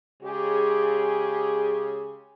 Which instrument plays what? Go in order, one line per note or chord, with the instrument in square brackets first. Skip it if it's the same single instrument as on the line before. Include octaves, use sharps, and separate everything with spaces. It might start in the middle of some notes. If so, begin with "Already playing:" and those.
[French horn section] C#3 G#3 G4 G#4